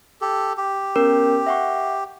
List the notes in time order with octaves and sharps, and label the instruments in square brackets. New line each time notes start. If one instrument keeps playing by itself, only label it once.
[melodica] G4 A4
G4
[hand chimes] B3 C#4 A#4
E5 F#5 C#6